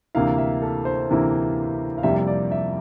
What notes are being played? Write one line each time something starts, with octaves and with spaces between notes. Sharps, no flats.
D2 C3 E3 A#3 E4 F5
E5
A4
C5
D2 C3 E3 A#3 E4
F5
F2 C3 G3 A#3 E4 E5
E5
D5
E5